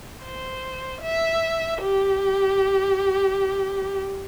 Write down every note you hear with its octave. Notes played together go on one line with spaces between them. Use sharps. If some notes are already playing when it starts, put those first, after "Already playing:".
C5
E5
G4